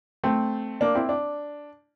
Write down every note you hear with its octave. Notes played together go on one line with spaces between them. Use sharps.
A3 C4
A#3 D4
C4 E4
D4